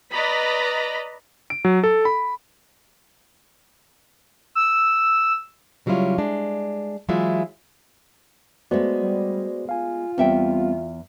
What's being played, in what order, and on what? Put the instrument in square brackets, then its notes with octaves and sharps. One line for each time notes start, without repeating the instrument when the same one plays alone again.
[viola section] B4 D5 D#5 A#5 B5
[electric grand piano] D7
F#3
A4
B5
[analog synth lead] E6
[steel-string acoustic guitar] C#3 F#3 G3 E4 F4 C#5
G#3 D4
E3 F#3 G#3 E4 F4 E5
[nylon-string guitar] G#3 A3 B3 [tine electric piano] F#4 C5 D5
[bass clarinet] G3
[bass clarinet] F4 [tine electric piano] F5 G#5
[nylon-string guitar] E2 E5 G5 [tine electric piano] G3 B3 C4